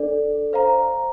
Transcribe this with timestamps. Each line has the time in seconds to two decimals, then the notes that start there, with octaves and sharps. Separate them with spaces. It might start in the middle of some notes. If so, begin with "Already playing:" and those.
Already playing: D4 A4 D5
0.53 C5 F5 A#5